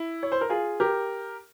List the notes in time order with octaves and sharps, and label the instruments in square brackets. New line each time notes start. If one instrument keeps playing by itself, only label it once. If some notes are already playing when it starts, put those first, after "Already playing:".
Already playing: [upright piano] E4
C#5
C5
A#4
F4 G#4
G4 A#4